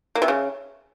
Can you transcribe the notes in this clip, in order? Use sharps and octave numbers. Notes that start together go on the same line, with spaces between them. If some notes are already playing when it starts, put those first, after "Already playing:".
A#3
C3
C#3